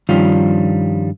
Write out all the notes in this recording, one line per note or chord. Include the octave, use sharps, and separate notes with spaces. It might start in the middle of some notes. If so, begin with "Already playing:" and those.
G2 D#3 F3 G3 C#4 F4